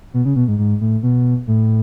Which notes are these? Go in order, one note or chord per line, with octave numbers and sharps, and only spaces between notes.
B2
C#3
B2
G#2
G#2
A2
B2
A2